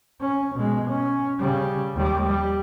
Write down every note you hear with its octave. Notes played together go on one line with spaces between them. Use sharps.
C#4
B2 G#3
C#4
C#3 G3
D#2 G3
G3